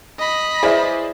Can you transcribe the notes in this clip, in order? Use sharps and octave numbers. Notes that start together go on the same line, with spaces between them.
D#5 B5
E4 G#4 B4 C5 D5 E5